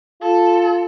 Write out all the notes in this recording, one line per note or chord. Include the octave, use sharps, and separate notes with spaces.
F4 A4